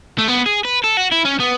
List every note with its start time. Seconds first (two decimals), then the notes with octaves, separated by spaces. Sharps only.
0.18 A3
0.28 B3
0.46 G#4
0.65 B4
0.84 A4
0.97 F#4
1.12 E4
1.25 C#4
1.40 B3